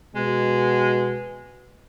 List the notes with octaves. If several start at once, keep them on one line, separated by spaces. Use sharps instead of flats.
B2 G#3